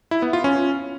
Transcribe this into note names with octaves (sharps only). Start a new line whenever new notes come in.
E4
B3
F4
C#4